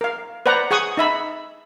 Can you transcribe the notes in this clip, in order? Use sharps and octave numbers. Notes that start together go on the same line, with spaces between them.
A#4 F5
B4 C5 D5 F#5 A#5
G#4 F#5 C#6 D#6
D#4 E5 B5